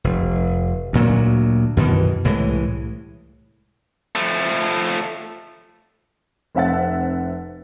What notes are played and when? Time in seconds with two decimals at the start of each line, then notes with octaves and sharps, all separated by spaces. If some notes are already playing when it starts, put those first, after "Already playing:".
0.04 F1
0.93 D2 A#2 F#3
1.77 F#2 B2 D#3 E3
2.25 C2 A2 E3 G#3
4.15 F3 A3
6.55 F1 C4 E5 F#5 A6